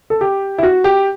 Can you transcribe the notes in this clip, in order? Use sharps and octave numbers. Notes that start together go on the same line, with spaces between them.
A4
G4
E4
F#4
G4